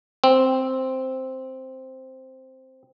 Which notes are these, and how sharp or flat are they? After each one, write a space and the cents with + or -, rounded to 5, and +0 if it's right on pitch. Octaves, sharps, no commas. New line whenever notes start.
C4 +0